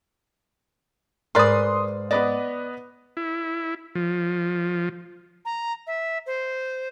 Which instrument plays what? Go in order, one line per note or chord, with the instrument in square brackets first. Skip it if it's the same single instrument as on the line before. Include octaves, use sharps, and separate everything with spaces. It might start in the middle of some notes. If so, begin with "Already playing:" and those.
[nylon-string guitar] G#2 [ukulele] A#4 B4 D5 [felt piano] C6 D#6
[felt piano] B3 B4 D#5 [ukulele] D5
[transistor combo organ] E4
F3
[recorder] A#5
E5
C5